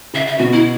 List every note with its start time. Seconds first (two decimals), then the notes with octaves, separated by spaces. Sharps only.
0.14 C#3 E5
0.27 E5
0.38 B2 F#4
0.52 E4